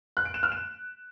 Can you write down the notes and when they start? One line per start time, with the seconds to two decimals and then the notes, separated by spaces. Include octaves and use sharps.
0.17 F#6
0.25 D7
0.34 E7
0.43 F6
0.52 E7